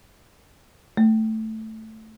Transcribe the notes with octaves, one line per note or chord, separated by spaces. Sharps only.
A3